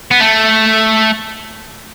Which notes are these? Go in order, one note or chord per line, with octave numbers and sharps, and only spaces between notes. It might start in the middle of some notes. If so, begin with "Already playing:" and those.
B3
A3